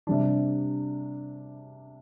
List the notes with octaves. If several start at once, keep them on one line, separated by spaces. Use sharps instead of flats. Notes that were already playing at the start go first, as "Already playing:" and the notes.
C3 G3 D4